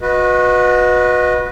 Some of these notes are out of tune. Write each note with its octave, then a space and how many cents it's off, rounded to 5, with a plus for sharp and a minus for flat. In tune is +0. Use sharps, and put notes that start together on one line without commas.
F#4 -30 B4 -5 D#5 +0